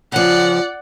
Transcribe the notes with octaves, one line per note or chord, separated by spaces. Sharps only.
C#3 F3 D5 F#5